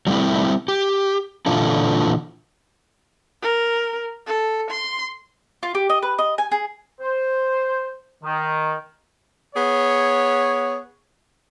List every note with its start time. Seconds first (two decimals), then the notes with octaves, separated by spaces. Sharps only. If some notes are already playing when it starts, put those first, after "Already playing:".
0.07 F#3 G3 A3 C4 E4
0.68 G4
1.46 A#2 D3 E3 D4 F4 A4
3.42 A#4
4.27 A4
4.71 C6
5.63 F4
5.75 G4
5.90 D#5
6.03 B4
6.19 D#5
6.38 G#5
6.52 G#4
7.01 C5
8.24 D#3
9.55 B3 G#4 C#5